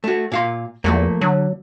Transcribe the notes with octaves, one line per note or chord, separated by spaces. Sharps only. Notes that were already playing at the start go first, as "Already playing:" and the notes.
A3 F#4
A#2 F5 C6
E2 F3 A3 A#3
D3 F#3